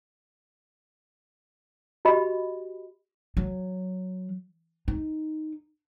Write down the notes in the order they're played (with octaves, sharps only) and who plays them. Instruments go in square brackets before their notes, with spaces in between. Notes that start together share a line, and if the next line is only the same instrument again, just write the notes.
[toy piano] F#4 G4 D#5 B5
[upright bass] F#3
D#4